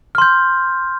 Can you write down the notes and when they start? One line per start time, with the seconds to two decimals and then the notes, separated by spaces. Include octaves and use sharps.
0.15 F6
0.18 C6
0.22 G6